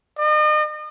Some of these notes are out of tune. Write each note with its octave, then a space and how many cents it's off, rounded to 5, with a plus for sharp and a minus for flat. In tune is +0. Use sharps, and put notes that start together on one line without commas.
D#5 -40